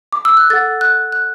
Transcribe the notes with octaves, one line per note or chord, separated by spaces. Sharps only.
D6
E6
F#6
A4 F#5 A6
F#6
F#6